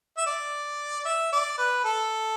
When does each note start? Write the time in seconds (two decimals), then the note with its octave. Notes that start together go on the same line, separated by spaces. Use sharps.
0.17 E5
0.26 D5
1.05 E5
1.32 D5
1.58 B4
1.85 A4